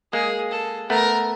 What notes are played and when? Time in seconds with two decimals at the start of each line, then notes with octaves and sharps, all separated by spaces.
0.13 G#3 A#3 G#4
0.51 A4
0.89 A3 B3 A#4